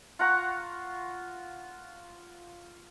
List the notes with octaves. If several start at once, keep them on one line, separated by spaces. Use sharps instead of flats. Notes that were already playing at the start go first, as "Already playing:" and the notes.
F4 F#5 A#5 C#6